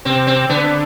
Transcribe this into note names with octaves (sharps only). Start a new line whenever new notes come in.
C3 C4
C4
D3 B3